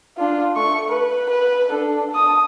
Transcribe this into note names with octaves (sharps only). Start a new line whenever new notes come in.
D4 F4
A3 C#6
B4
B4
D4 A4
A5 D#6